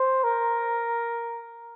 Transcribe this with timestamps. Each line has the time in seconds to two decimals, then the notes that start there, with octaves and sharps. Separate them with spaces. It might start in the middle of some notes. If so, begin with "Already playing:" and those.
Already playing: C5
0.24 A#4